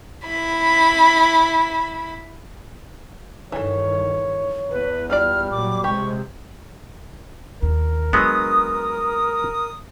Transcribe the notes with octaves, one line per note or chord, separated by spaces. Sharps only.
E4 B5
G2 D#3 E3 A4 C#5
E2 B4
G3 F4 B4 D5 F6
A#2 F#3 D6
C#2 C3 G#3 G4 C#6
D#2 A#4
F#3 G#3 B3 D4 D#6